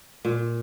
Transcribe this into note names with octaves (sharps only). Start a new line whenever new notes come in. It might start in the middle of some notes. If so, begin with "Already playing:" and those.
A#2